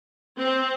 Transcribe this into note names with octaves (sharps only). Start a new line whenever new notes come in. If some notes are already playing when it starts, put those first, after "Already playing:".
C4